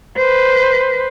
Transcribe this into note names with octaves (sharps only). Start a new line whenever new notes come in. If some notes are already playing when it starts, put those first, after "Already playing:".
B4 C5